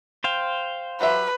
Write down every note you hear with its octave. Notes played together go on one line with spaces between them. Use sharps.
C5 F5 G5
F#3 G4 B4 E5